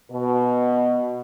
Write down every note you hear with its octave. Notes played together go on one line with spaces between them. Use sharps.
B2